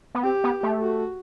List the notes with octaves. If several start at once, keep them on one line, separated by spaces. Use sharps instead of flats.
B3
C4 G4
B3
A3
F#4